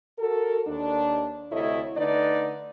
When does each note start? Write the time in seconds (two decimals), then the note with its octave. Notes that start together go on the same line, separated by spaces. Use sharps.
0.19 F#4 A4 A#4
0.67 D#2 D4
1.52 D2 C3 E4 A4 C#5 D#5
1.97 D3 A3 D#4 B4 D5